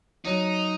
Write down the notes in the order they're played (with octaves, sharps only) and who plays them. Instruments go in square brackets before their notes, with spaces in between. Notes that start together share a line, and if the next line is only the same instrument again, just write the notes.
[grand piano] F#3 [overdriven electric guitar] D#4